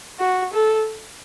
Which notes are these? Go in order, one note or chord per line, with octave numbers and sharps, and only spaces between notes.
F#4
A4